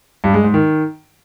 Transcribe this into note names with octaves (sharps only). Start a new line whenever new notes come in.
G2
G#3
G#2
D#3